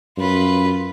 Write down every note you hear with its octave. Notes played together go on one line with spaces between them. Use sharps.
F#2 F4 B4